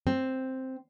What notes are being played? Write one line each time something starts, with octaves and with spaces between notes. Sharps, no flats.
C4